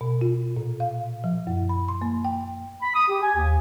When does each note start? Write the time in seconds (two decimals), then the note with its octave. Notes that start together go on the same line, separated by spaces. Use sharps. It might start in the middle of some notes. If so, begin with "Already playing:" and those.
0.01 B2
0.21 F4
0.56 A#2
0.80 F5
1.24 F3
1.47 F#2
1.69 B5
1.88 C6
2.02 A#3
2.25 G5
2.82 B5
2.94 D#6
3.09 G4
3.21 G#5
3.36 D#2